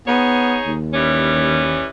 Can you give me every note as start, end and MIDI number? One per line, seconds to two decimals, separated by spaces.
0.08 0.59 59
0.08 0.72 63
0.08 0.72 68
0.08 0.72 73
0.67 1.85 39
0.94 1.86 52
0.94 1.86 55
0.94 1.86 61